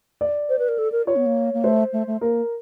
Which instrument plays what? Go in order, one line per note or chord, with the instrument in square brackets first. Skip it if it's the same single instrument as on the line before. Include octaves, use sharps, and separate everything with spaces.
[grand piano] D5
[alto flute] C5
B4
A#4
A4
A#4
[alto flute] F4 [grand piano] C#5
[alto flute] B3
A#3
A#3
[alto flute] A3 [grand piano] C5
[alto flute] A3
A3
[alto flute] A#3 [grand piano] A#4